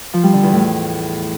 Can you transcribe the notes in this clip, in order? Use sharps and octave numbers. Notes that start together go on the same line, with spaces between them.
F3
G3
D3
E2
A2